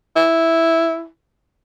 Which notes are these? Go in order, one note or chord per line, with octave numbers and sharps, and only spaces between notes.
E4